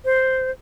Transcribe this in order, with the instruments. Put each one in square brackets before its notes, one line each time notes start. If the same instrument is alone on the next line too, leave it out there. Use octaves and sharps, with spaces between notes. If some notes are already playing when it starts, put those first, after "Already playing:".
[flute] C5